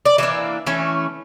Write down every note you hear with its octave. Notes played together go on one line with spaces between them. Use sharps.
D5
E3 A#3 D4 E5
E3 A3 C#4